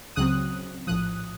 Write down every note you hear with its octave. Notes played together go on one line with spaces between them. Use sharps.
C#2 C#3 F#3 C4 D#6 F#6
A#1 A2 F3 D#6 F#6